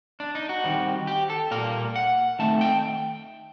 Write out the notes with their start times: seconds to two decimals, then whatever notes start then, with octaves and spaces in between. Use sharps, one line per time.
0.20 D4
0.35 D#4
0.49 F#4
0.64 D#3 G3 C4
1.07 G4
1.30 A4
1.51 A#2 G3 A#3 A#4
1.96 F#5
2.39 D#3 A3 C4 A5
2.61 G5